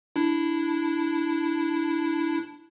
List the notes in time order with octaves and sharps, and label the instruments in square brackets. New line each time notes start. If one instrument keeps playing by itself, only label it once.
[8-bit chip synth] D4 E4